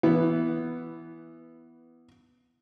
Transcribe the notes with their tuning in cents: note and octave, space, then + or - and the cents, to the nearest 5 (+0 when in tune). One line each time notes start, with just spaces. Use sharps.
E3 +10 B3 +0